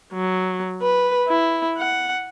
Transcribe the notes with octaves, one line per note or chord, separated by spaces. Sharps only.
F#3
B4
E4
F#5